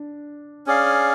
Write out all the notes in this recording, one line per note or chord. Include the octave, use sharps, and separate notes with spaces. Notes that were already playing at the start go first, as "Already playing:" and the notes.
Already playing: D4
C#4 G#4 D5 F5